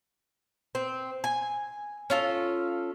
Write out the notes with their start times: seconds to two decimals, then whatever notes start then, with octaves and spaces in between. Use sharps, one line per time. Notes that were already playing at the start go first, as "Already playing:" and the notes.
0.75 C4
1.24 G#5
2.10 C#4 F4 A4